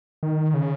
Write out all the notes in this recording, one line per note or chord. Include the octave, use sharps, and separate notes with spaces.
D#3
C#3